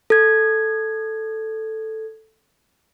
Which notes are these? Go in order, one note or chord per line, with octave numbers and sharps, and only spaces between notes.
A4 G#6